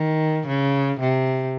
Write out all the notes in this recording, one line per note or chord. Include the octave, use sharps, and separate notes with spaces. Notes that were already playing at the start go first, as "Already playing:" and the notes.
Already playing: D#3
C#3
C3